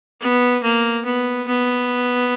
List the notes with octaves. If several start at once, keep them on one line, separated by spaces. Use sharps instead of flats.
B3
A#3
B3
B3